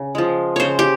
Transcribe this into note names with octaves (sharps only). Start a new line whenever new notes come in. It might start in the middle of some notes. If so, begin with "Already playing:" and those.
Already playing: C#3
F3 G#3
C#3 C5 C#5
G4